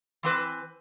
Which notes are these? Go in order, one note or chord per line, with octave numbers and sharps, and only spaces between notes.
E3 C4 B4